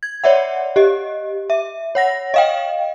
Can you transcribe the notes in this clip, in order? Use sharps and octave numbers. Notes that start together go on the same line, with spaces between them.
G#6
C#5 D5 E5 F#5
G4 D#5
E5
C#5 F#5 A#6
D#5 F5 G5